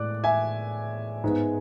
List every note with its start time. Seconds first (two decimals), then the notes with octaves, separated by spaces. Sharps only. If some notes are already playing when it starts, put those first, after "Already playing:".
Already playing: A2 G#3 D5 D6 F#6
0.24 E5 G#5
1.24 G#2 G#3 B3